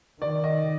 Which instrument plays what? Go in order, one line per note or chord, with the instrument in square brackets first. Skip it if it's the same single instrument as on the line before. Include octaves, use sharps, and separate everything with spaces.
[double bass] D#3 [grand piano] D5
[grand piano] D#5